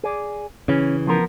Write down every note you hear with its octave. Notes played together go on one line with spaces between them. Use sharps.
G#4 D5
C#3 E3 C#4
F3 B3 A#4